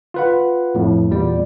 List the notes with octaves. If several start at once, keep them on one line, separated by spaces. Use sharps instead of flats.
F4 B4 F#5
F2 A2
E2 A#2 G3 D5